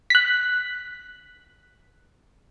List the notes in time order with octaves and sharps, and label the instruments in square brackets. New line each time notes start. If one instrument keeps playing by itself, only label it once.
[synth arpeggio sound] F#6 B6